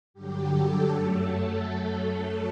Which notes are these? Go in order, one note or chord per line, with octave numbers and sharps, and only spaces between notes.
G2 D3 F#3 G4
A4
F#2 F#3 A3
A4